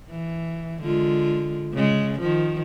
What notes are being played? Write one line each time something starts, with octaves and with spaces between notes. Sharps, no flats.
E3
D3 G#3 F4
C#3 G#3
D#3 F3